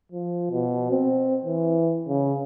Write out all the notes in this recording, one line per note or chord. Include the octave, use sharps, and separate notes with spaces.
F3
B2
C4
E3
C#3